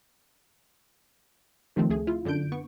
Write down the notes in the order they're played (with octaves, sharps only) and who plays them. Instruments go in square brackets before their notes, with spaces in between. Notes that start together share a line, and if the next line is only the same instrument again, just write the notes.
[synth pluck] C3 D#3 F3 A3 C4
D2 A3 G#4
E4 F4
F#2 D3 D4 G6 D7
B3 C#6